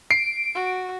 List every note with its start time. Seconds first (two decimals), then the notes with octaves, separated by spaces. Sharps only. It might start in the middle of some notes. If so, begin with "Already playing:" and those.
0.11 C7 D7
0.55 F#4